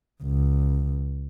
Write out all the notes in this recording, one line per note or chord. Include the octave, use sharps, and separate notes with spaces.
C#2